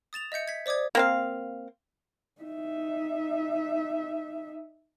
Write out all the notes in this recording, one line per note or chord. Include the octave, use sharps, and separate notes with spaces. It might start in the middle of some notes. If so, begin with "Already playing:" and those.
D#6 A6 E7 F7
D#5 E5 G6 C#7
G#6 B6
C5 D5 D6 D#6 G#6
A#3 C4 F5
D#4 E5